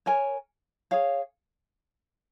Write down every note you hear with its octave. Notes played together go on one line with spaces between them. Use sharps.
A#4 C#5 G#5
G#4 C#5 F5